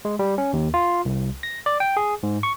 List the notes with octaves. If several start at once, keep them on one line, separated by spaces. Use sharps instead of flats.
G#3
G3
C#4
D#2
F4
C2
A#6
D5
G5
G#4
G#2
C#6